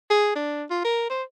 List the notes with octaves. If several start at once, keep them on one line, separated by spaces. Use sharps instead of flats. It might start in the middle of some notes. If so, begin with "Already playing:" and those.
G#4
D4
F4
A#4
C5